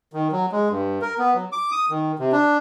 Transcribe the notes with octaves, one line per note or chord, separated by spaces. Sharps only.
D#3
F#3
G#3
G2
A#4
B3
F#3
D6
D#6
D#3
C3
D4